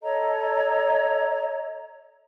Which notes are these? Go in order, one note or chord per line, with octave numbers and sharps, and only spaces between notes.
A4 C#5 D#5 A#5